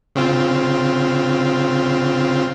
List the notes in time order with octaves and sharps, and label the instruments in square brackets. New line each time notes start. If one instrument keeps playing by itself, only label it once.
[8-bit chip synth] C#3 C4 F4